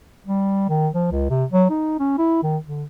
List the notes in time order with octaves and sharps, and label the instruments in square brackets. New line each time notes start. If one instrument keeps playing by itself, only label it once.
[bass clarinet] G3
D#3
F3
C#2
C3
F#3
D#4
C#4
E4
D#3
D3